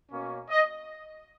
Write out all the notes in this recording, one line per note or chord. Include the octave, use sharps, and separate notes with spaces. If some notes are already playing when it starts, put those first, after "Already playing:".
B2 A#3 C#4
D#5